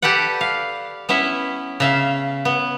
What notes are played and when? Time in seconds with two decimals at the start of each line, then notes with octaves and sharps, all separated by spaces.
0.02 G4 A4 B4 D5 F#5
0.41 F5
1.09 B3 C#4 E4 E5
1.80 C#3 E5 F5
2.45 B3